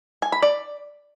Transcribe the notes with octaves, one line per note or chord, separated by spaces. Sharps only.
G#5
B5
D5